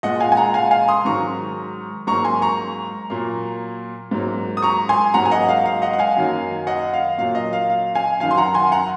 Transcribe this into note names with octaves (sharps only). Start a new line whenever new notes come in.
A#2 G#3 D#5 F#5
F5 G#5
G#5
F#5 A#5
F5 G#5
F5 G#5
C6 D#6
G#2 D#3 F#3 A#5 C#6
G#2 F#3 A#3 A#5 C#6
G#5 C6
A#5 C#6
A#2 F#3 A#3
G#2 F#3 A#3
D#6
A#5 C#6
G#5 C6
G#2 F#3 A#3 F#5 A#5
G#5
D#5 F#5
F5
F5
D#5 F#5
F#5
F5 G#5
F#2 D#3 F#3 A#3
D#5 F#5
F5
A#2 F#3 A#3 F5
D#5
F5
F5
F5 G#5
F#2 D#3 F#3 F5 G#5
C6
F#5 A#5
G#5 C6
F#5 A#5